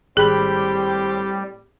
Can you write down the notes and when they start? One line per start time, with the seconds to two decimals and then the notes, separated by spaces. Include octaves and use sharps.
0.17 G#1 A2 G3 C4 G4 G#4 B5